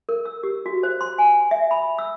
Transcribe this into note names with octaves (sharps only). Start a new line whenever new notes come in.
A#4
E6
G4
F#4
C5
C6
G#5
E5
B5
E6